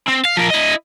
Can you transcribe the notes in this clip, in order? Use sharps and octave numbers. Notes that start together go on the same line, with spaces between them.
C4
F5
F3 A#4
E4 D#5